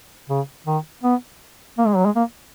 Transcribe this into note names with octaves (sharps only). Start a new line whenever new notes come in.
C#3
D#3
B3
A#3
G#3
F#3
G#3
A#3